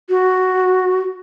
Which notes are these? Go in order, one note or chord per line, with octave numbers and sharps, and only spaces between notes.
F#4